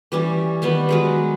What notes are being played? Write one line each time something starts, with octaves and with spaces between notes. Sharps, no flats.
E3 G3 C#4
D#3 G3 B3
F#3 G#3 B4